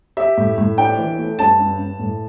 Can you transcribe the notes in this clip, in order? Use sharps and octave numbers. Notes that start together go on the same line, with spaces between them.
G4 E5
A2
A2
D4 G5
E3
A3
G2 A5
G2
G2
A2